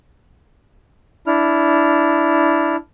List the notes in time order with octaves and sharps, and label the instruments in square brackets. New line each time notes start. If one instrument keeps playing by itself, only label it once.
[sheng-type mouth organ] D4 E4 F6